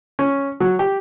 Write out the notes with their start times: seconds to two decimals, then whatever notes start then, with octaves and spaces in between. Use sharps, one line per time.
0.19 C#4
0.60 F#3
0.79 G4